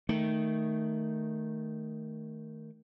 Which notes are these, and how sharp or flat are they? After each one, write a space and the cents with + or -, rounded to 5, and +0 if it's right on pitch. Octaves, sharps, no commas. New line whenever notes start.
D#3 +0 A3 +0